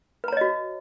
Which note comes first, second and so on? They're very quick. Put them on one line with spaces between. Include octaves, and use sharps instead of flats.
B4 A#5 C#5 D#5 F#4